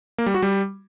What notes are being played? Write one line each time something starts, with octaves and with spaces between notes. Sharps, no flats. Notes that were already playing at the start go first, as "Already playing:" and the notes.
A#3
G3
F#4
G3